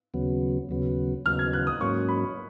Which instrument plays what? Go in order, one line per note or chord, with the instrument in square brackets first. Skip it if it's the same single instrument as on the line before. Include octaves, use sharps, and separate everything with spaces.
[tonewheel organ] D#2 C#3 F#3 B3
D#2 C#3 F#3 B3
[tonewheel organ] D#2 C#3 F#3 B3 [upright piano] F6
[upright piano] G#6
F#6
D#6
[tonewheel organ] G#2 F#3 A#3 C#4 [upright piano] C#6
[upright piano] B5